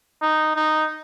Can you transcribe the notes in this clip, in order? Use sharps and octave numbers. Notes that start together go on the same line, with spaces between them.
D#4
D#4